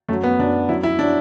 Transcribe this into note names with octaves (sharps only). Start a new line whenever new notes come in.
F#2 F#3 A3
B3
F#2 F#3 D4
F#2 F#3 E4
E4
F#3 D4